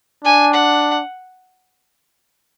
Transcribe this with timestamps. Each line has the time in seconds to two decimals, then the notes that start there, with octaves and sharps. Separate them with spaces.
0.24 D4 G#5
0.53 F#5